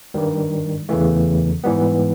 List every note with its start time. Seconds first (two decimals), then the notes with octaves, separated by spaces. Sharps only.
0.14 G2 D#3 G3
0.89 E2 C#3 E3 A3
1.64 G#2 E3 G3 B3